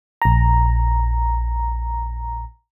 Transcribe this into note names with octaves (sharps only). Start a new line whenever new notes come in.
A#1 A#5